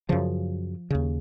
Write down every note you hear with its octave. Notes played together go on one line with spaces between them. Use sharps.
F#2 C#3 F3
D#2 C#3